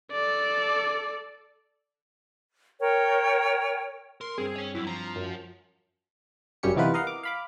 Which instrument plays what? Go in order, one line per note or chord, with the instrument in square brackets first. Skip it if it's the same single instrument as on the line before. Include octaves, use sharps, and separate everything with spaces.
[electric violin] A4 D5
[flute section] A#4 C#5 G5
[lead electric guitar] A#4 [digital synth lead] C6
[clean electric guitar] G2 C4 [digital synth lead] G#4
[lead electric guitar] C#5 G#5
[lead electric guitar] F#2 [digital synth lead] E4
[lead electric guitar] F3 [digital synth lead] A#5
[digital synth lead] F#2
[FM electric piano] G1 F#2 G3 C#4 G4 C#7
C3 E3 B3 D#4 F4 B4
A#4 D#5 F5 F#5
D6
F5 B5 D6